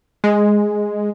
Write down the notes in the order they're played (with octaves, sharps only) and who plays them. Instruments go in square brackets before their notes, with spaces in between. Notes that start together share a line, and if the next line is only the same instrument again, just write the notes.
[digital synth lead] G#3